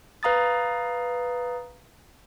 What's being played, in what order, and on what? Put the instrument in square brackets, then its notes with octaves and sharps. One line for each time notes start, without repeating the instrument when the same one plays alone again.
[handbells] B4 F5 A#5 D#6 A6